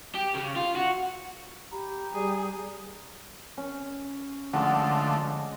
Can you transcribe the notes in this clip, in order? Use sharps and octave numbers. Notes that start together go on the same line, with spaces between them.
G4
C#3
F4
F#4
G4 A#5 B5
G3 G#4
C#4
D3 F3 G#3 A3 F#4